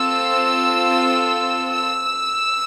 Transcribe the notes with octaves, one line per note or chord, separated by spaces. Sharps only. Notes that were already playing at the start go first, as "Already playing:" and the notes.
Already playing: C4 F4 A4 E6
E6